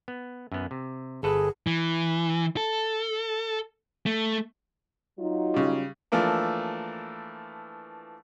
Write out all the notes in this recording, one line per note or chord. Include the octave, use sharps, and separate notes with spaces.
B3
F#2 B3
C3
G1 G#4 A4 B4
E3
A4
A3
F#3 D#4 F4
C#3 G3
E3 F3 A3 A#3 D4